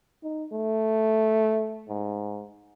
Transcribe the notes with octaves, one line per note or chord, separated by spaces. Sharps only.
D#4
A3
G#2